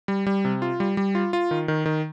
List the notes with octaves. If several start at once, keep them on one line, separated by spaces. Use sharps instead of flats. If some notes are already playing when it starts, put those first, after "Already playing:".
G3
G3
C3
F4
G3
G3
F4
F4
D#3
D#3
D#3